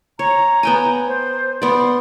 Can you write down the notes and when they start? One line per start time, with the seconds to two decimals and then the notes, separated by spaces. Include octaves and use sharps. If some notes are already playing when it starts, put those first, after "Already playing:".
0.19 C#5 A#5
0.63 B3 G5 G#5
1.07 C5
1.62 B3 D5 C6